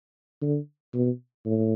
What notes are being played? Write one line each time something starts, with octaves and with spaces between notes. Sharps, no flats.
D3
B2
A2